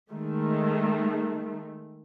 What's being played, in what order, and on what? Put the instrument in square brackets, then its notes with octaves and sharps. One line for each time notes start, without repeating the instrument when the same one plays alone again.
[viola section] D#3 G#3 A3